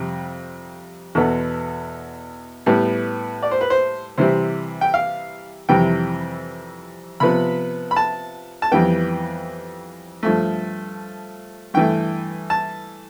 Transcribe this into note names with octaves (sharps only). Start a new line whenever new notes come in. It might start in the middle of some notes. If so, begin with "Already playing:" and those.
Already playing: F2 C3 G3
E2 B2 B3 A4
A2 G3 B3
D5
C5
B4
C5
C3 E3 G3 C5
G5
F5
F2 C3 E3 G3 G5
C3 F3 B3 B5
B5
A5
A5
F2 E3 G3 B3 G5
G2 F3 A3
G2 E3 A3 G5
A5